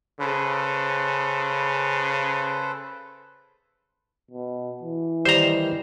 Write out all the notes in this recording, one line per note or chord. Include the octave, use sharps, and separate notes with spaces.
C#3 A4 B4 C5
B2
E3
D#3 G3 C5 A#5